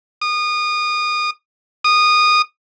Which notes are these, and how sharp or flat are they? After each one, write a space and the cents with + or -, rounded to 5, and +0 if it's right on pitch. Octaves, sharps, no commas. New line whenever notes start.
D#6 -30
D#6 -20